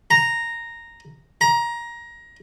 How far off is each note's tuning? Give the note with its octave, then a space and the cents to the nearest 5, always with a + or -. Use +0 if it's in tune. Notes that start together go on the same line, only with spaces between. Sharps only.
A#5 -5
A#5 +20